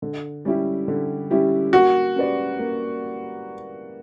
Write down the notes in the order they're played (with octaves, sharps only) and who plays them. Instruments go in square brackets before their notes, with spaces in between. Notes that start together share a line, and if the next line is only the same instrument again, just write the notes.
[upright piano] D3
G3 C#4 E4 G4
D3
G3 C#4 E4 G4
[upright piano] A#3 [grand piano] F#4
[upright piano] C#4 G4 B4 D5
A#3